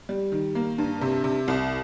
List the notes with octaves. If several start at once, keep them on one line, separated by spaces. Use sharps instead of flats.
G3
D#3
A#3
G2
C3
C3
C2